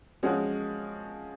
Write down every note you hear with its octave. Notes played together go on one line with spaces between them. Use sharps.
F3 G#3 C#4 F#4